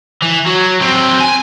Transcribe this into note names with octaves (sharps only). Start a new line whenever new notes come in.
E3
F#3
F#3 C4
G#5